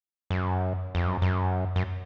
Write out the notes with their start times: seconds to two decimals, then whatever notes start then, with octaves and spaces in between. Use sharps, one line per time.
0.30 F#2
0.95 F2
1.07 F#2
1.22 F#2
1.76 F#2